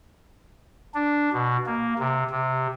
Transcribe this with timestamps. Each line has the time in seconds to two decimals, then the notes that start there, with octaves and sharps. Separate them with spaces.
0.95 D4
1.33 B2
1.66 A#3
1.99 C3
2.31 C3